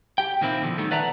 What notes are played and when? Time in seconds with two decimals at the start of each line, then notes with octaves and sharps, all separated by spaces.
0.18 G4 G5
0.41 A#2 D#3 A#3 C4 E4
0.62 B2 D3 F3
0.78 D#3 G3 A3
0.91 B4 D5 E5 F#5 A5 A#5